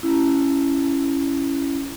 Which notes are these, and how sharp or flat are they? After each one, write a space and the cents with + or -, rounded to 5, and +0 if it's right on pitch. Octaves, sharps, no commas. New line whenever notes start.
C#4 -5 E4 +10